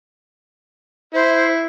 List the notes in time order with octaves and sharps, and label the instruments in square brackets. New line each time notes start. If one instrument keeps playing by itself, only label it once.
[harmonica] E4 [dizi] C5